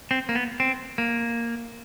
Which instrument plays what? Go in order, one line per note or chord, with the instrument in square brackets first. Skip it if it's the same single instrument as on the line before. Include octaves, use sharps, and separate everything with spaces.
[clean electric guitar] C4
A#3
B3
C4
A#3